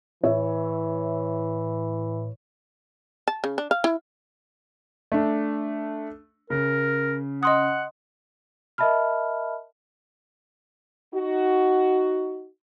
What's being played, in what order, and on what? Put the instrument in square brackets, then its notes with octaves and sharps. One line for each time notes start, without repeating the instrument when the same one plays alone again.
[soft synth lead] A2 [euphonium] E3 [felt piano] C#5 E5
[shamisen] A5
C#3
D4
F5
E4
[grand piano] A3 D4
[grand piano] C#3 [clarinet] A#4
[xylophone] D#5 C6 D#6 [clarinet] F#5
[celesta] A#4 D#5 E5 A5 B5 F6
[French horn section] D#4 F#4